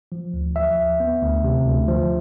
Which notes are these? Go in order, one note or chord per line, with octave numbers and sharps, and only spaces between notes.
F3
D2
F3 E5
D2
B3
D2
C3
D2
F3